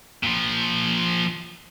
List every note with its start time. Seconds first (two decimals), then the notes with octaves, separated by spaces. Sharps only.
0.24 A#2 F3